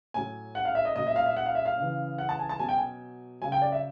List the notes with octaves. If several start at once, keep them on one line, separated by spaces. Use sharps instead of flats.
A2 F#3 G#5
F#5
F5
E5
D#5
A#2 F#3 D#5
E5
F5
E5
F#5
F5
E5
F5
C#3 E3
F#5
A5
G#5
A5
B2 F#3 G#5
G5
G#5
C#3 F#3 G#5
G5
D5
E5